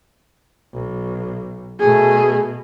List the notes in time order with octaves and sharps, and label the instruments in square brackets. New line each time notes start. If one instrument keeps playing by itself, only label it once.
[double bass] B1
[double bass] B2 [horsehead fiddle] A3 G#4